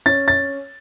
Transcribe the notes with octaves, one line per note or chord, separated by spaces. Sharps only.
C#4 A6
A6